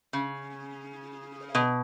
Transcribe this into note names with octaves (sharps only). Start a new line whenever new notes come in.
C#3
B2